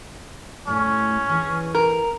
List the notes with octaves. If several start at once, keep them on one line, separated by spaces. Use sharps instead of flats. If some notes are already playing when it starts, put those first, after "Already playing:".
A2 G3 A3 C#4
E3 G#4
A#4